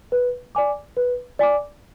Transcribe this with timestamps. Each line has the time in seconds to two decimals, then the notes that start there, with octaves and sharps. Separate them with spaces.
0.12 B4
0.55 D5 G#5 D6
0.97 B4
1.39 D5 G#5 D6